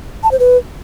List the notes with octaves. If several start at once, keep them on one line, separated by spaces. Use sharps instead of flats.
A5
C5
B4